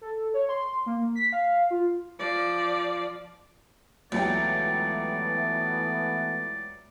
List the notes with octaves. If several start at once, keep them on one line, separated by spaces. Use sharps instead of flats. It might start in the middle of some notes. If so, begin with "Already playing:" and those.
A4
C#5
C6
A#3
B6
F5
F4
F3 D5
C#2 E3 F#3 A3 B3 G4 D5